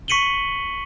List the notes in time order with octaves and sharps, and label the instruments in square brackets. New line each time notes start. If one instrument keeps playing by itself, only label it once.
[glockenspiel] C#6 B6 C#7 D#7 F#7 G7